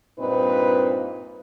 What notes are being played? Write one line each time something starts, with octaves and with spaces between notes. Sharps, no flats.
G2 A#2 C4 D#4 B4